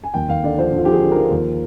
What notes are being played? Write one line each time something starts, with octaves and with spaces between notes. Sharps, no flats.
G#5
D#2 G5
D#2 F5
D3 D5
F3 C5
D3
F4
F3 G4
G#4
D3
F3 A#4
D#2